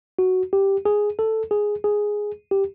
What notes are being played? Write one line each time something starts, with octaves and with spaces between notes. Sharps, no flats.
F#4
G4
G#4
A4
G#4
G#4
G4